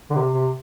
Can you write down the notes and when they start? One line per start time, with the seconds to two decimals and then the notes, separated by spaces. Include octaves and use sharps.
0.10 D3
0.15 C3
0.34 C3